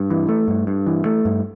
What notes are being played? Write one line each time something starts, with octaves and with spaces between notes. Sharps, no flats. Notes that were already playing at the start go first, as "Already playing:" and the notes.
Already playing: G2
E3
A3
G2
G2
E3
A3
G2